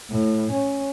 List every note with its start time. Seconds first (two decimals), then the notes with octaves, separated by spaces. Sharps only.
0.10 A2
0.52 C#4